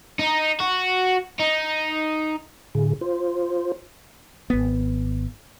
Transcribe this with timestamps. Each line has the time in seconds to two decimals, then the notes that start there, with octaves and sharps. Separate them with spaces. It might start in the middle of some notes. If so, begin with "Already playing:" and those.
0.19 D#4
0.60 F#4
1.39 D#4
2.75 A2 D3 G#4
3.01 F4 C5
4.50 G#1 B3